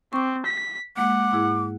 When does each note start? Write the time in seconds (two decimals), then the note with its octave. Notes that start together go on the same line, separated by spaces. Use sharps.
0.13 C4 C#6 D6
0.46 B6
0.97 G#3 A#3 F#5 D6
1.33 G#2 E4 G#4